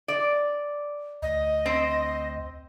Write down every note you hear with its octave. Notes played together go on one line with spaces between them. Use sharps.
D5
D2 D#5
C4